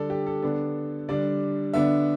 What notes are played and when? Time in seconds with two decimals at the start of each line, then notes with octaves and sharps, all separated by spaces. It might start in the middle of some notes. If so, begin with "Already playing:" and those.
Already playing: D3 G3 D4 A4 D5
0.10 G4
0.27 A4
0.43 D3 B3 D4
1.09 D3 G3 D4 D5
1.73 D3 B3 D4 E5